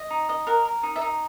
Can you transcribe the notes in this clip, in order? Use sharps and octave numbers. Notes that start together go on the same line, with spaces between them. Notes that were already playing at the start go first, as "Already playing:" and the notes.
Already playing: D#5
D#4
D#5
A#4 F#5
A#4
D#4
E5
D#4